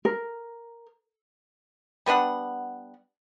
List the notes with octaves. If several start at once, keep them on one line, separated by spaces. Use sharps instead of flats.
A#4
G3 B3 D4 F#5